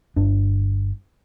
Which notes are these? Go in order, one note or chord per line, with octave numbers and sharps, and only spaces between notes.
G1 G2 D4